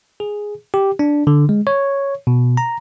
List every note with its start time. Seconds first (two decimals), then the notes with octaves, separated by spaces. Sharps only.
0.20 G#4
0.74 G4
0.99 D4
1.27 D3
1.49 G#3
1.67 C#5
2.27 B2
2.57 A#5